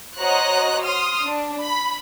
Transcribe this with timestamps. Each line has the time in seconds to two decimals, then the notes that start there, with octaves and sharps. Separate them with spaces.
0.17 F#4 C5 C#5 D#5 A#5 F#6
0.84 C6 D#6 F6
1.23 D4
1.62 B5